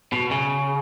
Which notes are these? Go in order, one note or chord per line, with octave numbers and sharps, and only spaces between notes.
B2
C#3